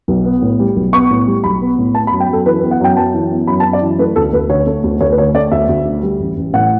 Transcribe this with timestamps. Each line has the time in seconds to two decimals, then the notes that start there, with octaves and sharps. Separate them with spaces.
0.08 B1
0.25 B3
0.42 A2
0.59 G3
0.76 B1
0.93 B3 C#6
1.10 A2
1.27 G3
1.44 B1 B5
1.61 B3
1.78 A2
1.95 B3 A5
2.07 B5
2.12 F#2
2.20 G5
2.29 F#2 A4
2.46 E3 B4
2.59 B4
2.63 B3
2.71 F#5
2.80 F#2 G5
2.97 F#2 A5
3.14 E3
3.31 B3
3.47 F#2 B5
3.60 A5
3.65 F#2
3.73 D5
3.82 E3
3.99 A3 B4
4.16 D2 A4
4.33 D2 B4
4.49 D3 C#5
4.67 A3
4.84 D2
5.00 D2 C#5
5.12 B4
5.18 D3 C#5
5.34 A3 D5
5.51 D2 E5
5.68 D2
5.86 D3
6.02 G3
6.20 A1
6.37 A1
6.53 A2 F#5